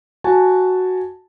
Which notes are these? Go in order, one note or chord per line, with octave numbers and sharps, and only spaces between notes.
F#4 G#5 A5